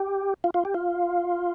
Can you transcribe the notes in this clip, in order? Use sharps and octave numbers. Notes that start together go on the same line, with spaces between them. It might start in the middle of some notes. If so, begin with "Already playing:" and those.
Already playing: G4
F4
F4
G4
F4